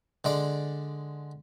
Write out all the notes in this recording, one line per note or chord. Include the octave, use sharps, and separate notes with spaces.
D3 G#3 D5